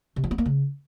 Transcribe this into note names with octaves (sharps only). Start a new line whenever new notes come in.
C3
F3
B3
A#3
C#3